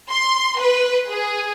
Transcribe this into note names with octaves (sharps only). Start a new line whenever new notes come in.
C6
B4
G#4